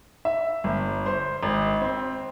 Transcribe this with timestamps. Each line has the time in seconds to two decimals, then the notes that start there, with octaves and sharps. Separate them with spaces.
0.25 E5
0.64 G1
1.06 C5
1.43 G#1
1.81 C4